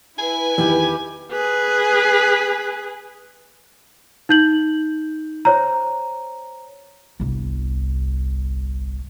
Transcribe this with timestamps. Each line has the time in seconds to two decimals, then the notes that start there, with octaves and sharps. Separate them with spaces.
0.18 E4 B4 G#5
0.58 E2 D#3 E3 G4
1.31 G#4 B4
4.29 D#4 G6 F#7
5.45 C5 C#5 A#5
7.20 G1 C2